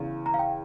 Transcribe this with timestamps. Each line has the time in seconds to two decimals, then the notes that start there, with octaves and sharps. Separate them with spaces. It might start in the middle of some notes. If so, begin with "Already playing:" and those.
Already playing: E2 C#3 E3
0.26 A#5
0.34 F5
0.39 G5